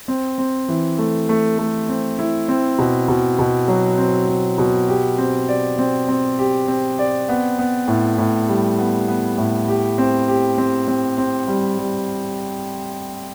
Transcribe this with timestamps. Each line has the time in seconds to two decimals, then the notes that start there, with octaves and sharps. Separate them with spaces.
0.08 C4
0.38 C4
0.68 E3
0.98 A3
1.29 A3
1.58 A3
1.89 C4
2.19 E4
2.48 C4
2.79 B2
3.08 B2
3.39 B2
3.68 F#3
3.98 C4
4.28 C4
4.58 B2
4.88 G4
5.18 C4
5.48 D5
5.79 C4
6.08 C4
6.39 G4
6.68 C4
6.99 D5
7.29 B3
7.59 B3
7.88 A2
8.18 A2
8.48 G3
8.79 B3
9.08 B3
9.38 A2
9.68 G4
9.98 C4
10.28 G4
10.58 C4
10.88 C4
11.18 C4
11.48 G3
11.78 G3